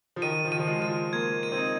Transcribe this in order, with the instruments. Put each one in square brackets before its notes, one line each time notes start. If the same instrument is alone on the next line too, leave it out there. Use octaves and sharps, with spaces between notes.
[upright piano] F3
[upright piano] D#3 [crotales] D#7
[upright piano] F3
[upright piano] D#3 [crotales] D#7
[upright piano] F3
G#3
[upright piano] F3 [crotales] D#7
[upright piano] G#3
[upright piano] A#3 [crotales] G#6
[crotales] D#7
[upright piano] C4
D#4